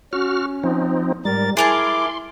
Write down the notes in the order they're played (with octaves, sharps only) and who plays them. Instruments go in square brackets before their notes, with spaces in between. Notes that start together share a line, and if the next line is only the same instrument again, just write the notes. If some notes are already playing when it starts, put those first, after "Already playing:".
[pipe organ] C#4 [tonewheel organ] F#4 F6
[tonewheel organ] F3 C4 D#4
[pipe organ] G#2 A#4 A6 [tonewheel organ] G3
[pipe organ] E4 D6 [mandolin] G#4 A#4 A5 [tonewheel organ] C6